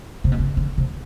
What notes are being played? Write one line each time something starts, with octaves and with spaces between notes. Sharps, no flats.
C3
B2
C3
D3
C3